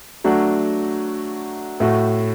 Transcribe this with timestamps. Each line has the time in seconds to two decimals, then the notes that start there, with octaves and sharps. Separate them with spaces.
0.24 F#3 A3 D4 F#4
1.80 A2 A3 F#4